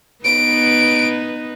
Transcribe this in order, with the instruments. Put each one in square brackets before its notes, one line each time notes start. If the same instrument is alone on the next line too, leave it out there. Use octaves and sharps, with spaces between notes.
[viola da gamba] B3 D#4 B4 [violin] D7